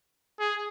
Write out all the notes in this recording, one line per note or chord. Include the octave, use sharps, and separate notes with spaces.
G#4